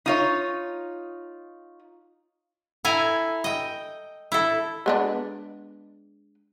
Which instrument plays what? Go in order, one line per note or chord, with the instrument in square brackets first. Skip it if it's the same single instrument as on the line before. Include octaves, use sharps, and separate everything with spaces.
[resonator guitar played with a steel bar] D#4 F4 C#5
[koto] E4 A4 G#5 A#5
D#5 G5
E4 A4
[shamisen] G#3 B3 D4